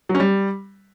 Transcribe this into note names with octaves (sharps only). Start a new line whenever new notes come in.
F#3
C#4
G3